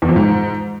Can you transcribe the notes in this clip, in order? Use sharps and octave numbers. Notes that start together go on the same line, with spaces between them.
E2
F2
G#2